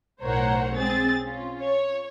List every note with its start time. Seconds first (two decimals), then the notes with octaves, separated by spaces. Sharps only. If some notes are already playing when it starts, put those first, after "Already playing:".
0.22 B1 A2 A#4 C5 C#5 F#5
0.76 G#3 C4 G#4 A6
1.23 C#4 F4
1.60 C#5